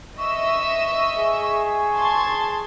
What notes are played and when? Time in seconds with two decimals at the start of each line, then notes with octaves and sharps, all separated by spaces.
0.18 D#5 E5 C#6 E6
1.19 G#4
1.95 A5 C6 G#6